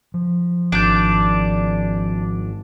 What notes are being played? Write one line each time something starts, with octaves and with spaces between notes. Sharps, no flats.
F3
G#1 D4 G6